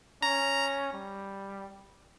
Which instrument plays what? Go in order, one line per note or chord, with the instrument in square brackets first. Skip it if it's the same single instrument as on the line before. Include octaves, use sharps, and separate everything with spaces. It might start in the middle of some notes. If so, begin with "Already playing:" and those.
[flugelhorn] C#4 [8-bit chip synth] A#5
[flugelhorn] G3